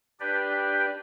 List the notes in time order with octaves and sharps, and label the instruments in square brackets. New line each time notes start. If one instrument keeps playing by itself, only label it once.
[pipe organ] D4 G4 B4 D5 G5